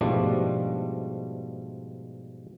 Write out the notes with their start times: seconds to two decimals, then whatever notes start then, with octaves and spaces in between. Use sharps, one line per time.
0.01 G#2 B2 F3 G3 A3 D4